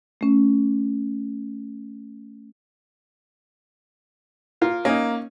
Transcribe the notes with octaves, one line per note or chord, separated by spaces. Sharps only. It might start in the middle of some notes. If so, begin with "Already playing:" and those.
A3 C#4
A#3 F4 A#4
A#3 C#4 D#4